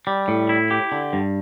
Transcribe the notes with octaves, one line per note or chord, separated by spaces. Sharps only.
G3
A2
E4
G4
D3
G2